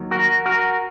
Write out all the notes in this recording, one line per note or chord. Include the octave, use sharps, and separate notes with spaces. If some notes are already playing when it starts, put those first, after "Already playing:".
Already playing: D#2 D#3 F#3
F#4 A#4
F#4 A#4